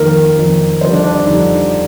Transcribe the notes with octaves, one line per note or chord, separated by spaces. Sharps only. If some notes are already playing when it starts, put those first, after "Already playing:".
Already playing: F2 D#3 A#3 A#4
F2 D#3 A#3
F2 D3 G3 C5
D4
D4
D4
F2 D3 G3 D#4